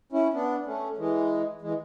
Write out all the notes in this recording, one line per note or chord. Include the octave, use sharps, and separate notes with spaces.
C#4 E4
B3 D4
A3 C#4
E3 G#3
E3 G#3